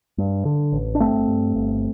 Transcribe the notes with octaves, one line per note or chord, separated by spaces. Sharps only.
G2
D3
A1
D4
G1 A3 C4
G2
G1